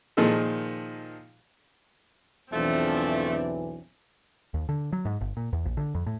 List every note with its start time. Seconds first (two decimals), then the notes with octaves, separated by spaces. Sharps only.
0.17 A#2 D#3 F3 G#3 A4
2.53 B1 E2 E3 F3 A3 C4 D4
4.54 D#2
4.69 D3
4.93 F#3
5.05 G#2
5.21 G1
5.37 A#2
5.53 E2
5.65 A#1
5.77 D3
5.95 F2
6.06 A2